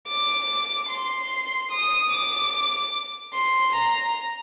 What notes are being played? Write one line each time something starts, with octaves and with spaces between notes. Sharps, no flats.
D6
C6
D#6
D6
C6
A#5